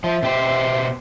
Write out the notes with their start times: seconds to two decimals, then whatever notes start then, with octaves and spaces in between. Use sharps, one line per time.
0.04 F3 E5
0.23 B2 G4 C5